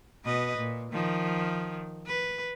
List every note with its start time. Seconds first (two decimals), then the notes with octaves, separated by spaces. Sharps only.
0.25 B2 B4 D#5
0.58 A#2
0.92 D#3 F3
2.06 B4